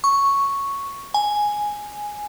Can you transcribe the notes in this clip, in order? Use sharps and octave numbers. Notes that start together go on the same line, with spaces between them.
C#6
G#5